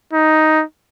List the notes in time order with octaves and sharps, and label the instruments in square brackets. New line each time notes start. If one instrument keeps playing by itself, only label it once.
[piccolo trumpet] D#4